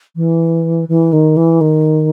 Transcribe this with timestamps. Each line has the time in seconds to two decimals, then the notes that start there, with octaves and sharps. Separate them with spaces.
0.16 E3
0.89 E3
1.13 D#3
1.37 E3
1.61 D#3